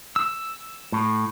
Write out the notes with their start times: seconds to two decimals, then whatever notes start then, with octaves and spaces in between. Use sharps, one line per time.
0.16 E6
0.92 A2